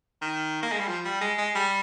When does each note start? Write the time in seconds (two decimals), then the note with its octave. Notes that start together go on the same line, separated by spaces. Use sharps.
0.22 D#3
0.62 A#3
0.72 G#3
0.79 G3
0.88 F3
1.05 G3
1.21 G#3
1.38 G#3
1.55 G3